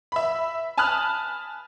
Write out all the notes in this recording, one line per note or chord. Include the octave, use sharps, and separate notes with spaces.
E5 B5
G#5 A5 B5 D#6 F6 F#6